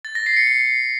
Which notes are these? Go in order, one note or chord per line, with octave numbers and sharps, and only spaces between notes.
A6
A#6
C7
C#7
C7